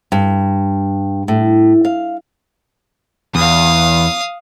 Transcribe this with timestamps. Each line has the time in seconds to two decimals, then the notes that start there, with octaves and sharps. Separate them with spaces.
0.12 G2
1.28 A2
1.85 F5
3.35 E2 F5 D#6